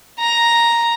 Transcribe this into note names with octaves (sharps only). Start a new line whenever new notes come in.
A#5